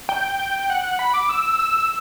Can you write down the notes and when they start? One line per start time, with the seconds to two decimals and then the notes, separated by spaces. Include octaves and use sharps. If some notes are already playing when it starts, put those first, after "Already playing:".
0.09 G5
0.40 G5
0.70 F#5
0.84 F#5
0.99 B5
1.14 D6
1.29 E6
1.59 E6